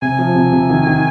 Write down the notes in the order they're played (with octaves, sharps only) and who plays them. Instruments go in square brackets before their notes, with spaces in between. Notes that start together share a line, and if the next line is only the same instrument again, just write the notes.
[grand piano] C3 [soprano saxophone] G#5
[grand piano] F3
C3
C3
D#3
D#3